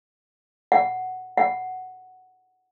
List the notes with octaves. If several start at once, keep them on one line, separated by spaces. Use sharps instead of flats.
F#5
F#5